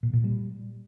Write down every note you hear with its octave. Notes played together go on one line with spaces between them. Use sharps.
A#2
A#2
G3